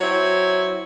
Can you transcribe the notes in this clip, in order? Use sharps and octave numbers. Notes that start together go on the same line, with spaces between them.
F#3 C4 E4 C#5